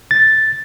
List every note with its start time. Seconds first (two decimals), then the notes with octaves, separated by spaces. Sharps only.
0.11 A6